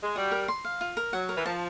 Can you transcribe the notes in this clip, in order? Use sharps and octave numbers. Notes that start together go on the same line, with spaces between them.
G#3
G3 F#4
A#4
C6
F5
F4
A#4
F#3 F#5
A#4
E3
F3 A5